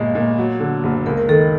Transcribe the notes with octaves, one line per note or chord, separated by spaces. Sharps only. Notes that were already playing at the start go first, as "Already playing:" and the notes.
Already playing: G1 A#2 G#3
A#2
F#3
D3
F#1
C#2 A#4
A#4
D#3 A4